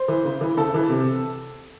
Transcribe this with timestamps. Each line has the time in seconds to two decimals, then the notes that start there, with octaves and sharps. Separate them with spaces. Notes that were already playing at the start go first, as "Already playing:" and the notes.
Already playing: C5
0.08 E3
0.25 C#3
0.41 E3
0.57 C#3 A4
0.74 E3
0.90 C3